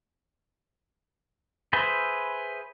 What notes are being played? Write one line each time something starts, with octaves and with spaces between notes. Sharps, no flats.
G#4 B4 C5 E5